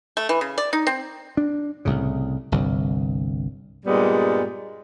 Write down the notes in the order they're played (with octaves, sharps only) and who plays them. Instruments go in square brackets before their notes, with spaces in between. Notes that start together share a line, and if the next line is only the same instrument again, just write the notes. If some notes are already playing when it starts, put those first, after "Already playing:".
[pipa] A3
E3
C#3
D5
D#4
C4
[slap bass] D4
C2 A2 C#3
G1 C2
[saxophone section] G2 A#2 G3 G#3 B3